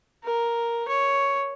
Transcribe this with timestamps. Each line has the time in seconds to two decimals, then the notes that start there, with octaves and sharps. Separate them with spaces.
0.24 A#4
0.89 C#5